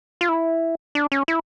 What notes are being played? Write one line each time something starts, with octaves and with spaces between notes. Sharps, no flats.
F4
E4
D4
C#4
E4